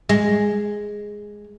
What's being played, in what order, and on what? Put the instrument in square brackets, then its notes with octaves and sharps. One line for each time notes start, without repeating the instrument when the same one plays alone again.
[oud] G#3